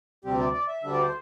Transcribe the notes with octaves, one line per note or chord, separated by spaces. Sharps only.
D2 C3 G3 C4 G4
D5
D5
E5
D2 D3 G3 D4 E5
D5
C5